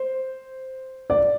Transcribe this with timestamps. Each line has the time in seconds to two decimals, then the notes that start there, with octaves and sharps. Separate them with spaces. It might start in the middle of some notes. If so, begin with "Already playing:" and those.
Already playing: C5
1.10 D5